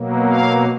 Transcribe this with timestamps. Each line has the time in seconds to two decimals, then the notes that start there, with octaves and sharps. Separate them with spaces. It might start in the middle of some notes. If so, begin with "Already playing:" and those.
Already playing: B2 F#3 A#3
0.27 F5